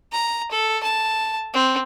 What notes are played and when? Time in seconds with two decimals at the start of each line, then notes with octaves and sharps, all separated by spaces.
0.12 A#5
0.51 A4
0.83 A5
1.54 C4